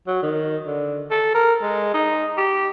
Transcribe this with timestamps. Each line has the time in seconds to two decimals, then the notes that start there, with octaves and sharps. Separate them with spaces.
0.07 F#3
0.22 D#3
0.66 D3
1.11 A4
1.35 A#4
1.62 G#3
1.94 D#4
2.37 G4